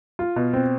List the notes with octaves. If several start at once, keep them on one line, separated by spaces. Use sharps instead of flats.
F4
B2
C4